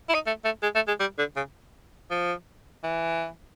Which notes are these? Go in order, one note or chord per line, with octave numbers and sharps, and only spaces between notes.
E4
D#4
A3
A3
G#3
A3
G#3
G3
D3
C#3
F3
E3